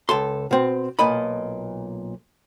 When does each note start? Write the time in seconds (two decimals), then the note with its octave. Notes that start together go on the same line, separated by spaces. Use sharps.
0.09 C#2 A4 C6
0.51 B2 C4
0.99 B1 A#2 D#5 B5